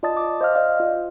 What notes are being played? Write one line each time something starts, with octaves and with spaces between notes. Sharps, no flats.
F4 D5 D#5 A5 D#6 A6
D6
C5 D#5 F5 F6
D5 D#5 F5
F4